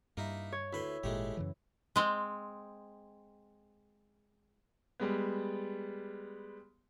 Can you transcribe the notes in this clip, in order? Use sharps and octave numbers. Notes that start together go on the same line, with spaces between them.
G2 A#3 D#4 E4
C#5
D2 E4 B4 C6
G#1 A#2 G#3 A3 G4
F#2 C#3 E3
G#3 C4
G3 G#3 B3